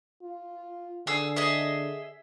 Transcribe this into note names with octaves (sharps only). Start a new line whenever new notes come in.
F4
D3 G#4 E6
G#4 D#5 E5